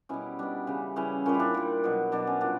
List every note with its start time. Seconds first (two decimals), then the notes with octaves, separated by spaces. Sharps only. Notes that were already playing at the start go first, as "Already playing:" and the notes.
0.09 B2 G3 C#4 E4
0.39 B2 G3 D4
0.67 C#3 E3 G3
0.96 C#3 E3 G3 C#4 E4
1.26 A#2 G3 C#4
1.34 E4
1.39 D4
1.54 A#2 G3
1.84 B2 F#3
2.12 B2 F#3 D4
2.27 C#4
2.41 A#2 G3 D4